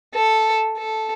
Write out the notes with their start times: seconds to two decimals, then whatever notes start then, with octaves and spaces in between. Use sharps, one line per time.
0.15 A4
0.77 A4